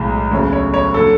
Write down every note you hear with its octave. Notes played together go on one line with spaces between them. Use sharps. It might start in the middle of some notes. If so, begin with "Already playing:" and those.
Already playing: B1 A2 G#3
D2 C#3 F#3 A3 C#5
C#5
C#5
D3 F#3 A4